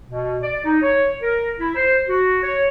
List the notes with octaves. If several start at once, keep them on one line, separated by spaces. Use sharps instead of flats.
B2
D5
D#4
C#5
A#4
E4
C5
F#4
C#5